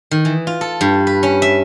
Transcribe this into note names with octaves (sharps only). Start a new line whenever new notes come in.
D#3
E3
F4
A4
G2
B4
C#4
E5